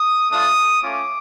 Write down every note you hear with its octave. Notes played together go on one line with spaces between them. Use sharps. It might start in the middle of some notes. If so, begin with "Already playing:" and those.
Already playing: D#6
A3 D4 F4 D#6
A3 C#4 F4 D6